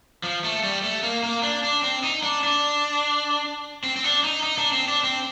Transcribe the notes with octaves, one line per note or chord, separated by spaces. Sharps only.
F3
A3
G3
A3
A#3
A#3
D4
D4
C4
D#4
D4
D4
C4
C4
D4
D#4
D#4
D4
C4
D4
C4